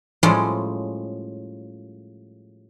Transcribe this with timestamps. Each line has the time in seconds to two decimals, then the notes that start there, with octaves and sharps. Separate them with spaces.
0.23 A2 F3 G3 G#3 C#4